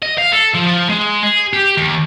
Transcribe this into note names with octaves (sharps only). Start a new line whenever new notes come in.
D#5
F5
A4
F3
F3
G#3
G#4
G4
D#2